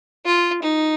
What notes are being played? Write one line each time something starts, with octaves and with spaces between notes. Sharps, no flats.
F4
D#4